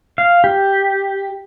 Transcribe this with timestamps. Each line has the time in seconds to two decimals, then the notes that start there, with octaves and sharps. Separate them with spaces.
0.18 F5
0.44 G4